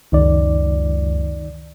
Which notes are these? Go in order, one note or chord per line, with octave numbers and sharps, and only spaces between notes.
C#2 F#2 D#3 D#4 D5